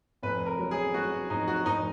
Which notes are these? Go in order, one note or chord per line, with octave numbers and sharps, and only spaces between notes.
F1 B4
A#4
F#3
G#4
F#3 F#4
F1 D#4
F#4
F1 D#4